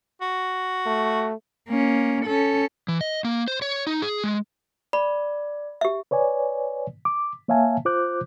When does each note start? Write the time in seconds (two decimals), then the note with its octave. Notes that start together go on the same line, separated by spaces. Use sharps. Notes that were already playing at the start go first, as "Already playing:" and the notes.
0.21 F#4
0.86 A3
1.69 A#3 C#4
2.25 C#4 A4
2.88 E3
3.01 D#5
3.25 A#3
3.48 C5
3.62 C#5
3.87 D#4
4.02 G#4
4.24 G#3
4.93 D5 B5
5.81 G4 E5
6.11 B4 C#5 D5 G#5
7.05 D6
7.48 A#3 C#5 E5 F5 G#5 A5
7.85 F4 C5 D6 F#6 G6